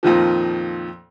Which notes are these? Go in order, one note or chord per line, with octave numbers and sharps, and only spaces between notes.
F2 A#2 D#3 F3